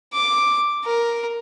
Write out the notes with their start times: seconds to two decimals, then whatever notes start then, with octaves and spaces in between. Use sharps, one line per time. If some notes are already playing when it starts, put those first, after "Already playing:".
0.13 D6
0.85 A#4